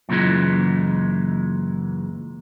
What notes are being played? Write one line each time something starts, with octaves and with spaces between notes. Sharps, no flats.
F#2 A#2 C#3 E3 G#3